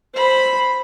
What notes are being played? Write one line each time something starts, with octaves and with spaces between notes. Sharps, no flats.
C5 B5